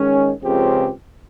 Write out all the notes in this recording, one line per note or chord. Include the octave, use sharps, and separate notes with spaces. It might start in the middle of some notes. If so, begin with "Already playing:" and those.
Already playing: D#3 G#3 C#4
C#2 C#3 F3 C4 G4